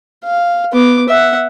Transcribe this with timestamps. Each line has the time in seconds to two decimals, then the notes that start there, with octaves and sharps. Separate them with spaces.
0.25 F5
0.73 B3 D6
1.09 E5 F#5